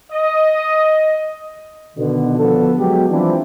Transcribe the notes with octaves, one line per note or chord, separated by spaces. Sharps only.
D#5
B2 D3 D#3
B2 D3 F3 B3 A4
F#3 G#3 B3 G4
E3 F3 G3 C4 D4 E4